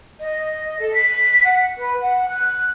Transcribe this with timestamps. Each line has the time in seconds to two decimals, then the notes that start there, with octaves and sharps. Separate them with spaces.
0.20 D#5
0.79 A4
0.93 B6
1.44 F#5
1.77 B4
2.01 F#5
2.28 F#6